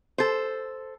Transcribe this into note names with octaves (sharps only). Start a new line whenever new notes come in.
A4 C5